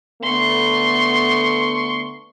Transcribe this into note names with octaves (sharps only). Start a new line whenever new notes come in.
D3 A3 B3 C6 C#6